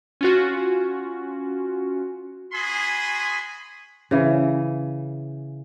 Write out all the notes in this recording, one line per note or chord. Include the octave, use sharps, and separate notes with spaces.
C#4 F4 F#4
F#4 G#4 G#5 B5 C6
C#3 E3